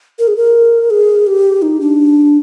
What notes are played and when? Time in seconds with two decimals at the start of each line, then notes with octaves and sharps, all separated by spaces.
0.19 A#4
0.28 G#4
0.37 A#4
0.90 G#4
1.27 G4
1.62 D#4
1.80 D4